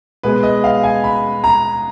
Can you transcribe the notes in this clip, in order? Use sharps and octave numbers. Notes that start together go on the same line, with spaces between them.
B2 G#3 B3 B4
D#5
F5
G#5
B5
A#5